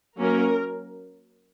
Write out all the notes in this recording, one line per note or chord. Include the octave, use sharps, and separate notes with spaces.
F#3 A#3 C#4 A#4